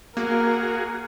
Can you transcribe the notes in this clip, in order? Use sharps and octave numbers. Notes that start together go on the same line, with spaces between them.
A#3 F#4 G#4 A#4